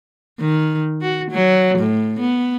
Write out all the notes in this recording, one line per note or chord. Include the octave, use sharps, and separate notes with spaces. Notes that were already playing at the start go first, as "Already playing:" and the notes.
D#3
F#4
F#3
A2
B3